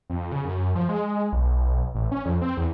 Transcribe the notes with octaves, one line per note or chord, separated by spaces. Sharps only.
F2
C#3
F#2
F3
G#3
B1
A1
C#4
F2
C4
E2